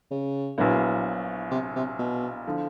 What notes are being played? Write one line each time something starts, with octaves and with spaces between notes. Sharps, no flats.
C#3
A#1 A#2 F#3 B3 E4
C3
C3
B2
D3 F3